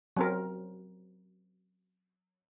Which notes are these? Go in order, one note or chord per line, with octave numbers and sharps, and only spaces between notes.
F#3 C4 A#4